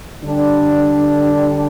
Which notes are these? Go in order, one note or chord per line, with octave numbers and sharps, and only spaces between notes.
D3 G3 D4 G4